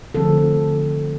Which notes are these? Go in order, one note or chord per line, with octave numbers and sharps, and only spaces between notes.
D3 F3 A3 C4 A4